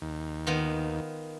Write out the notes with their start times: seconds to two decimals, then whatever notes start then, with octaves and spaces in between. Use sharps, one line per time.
0.02 D#2
0.47 D#3 B3 F4